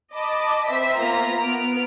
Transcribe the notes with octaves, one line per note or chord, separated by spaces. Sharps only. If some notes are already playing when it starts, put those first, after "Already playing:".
D#5 A5 B5 D6
C4 C5 E5 B6
A#3 B3 F4 A#5
B3 F6 D7